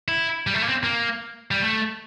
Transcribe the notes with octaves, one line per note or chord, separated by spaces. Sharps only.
E4
G3
A3
A#3
C4
A#3
G3
A3